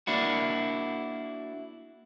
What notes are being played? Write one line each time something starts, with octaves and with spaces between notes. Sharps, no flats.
A#3 D4 E4 F#4